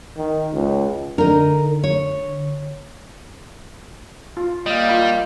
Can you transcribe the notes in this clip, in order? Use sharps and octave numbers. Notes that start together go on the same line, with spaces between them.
D#3
C#2
D3 D#4 A#4
C#5
F4
G3 A#3 D#5 F5
F4 B5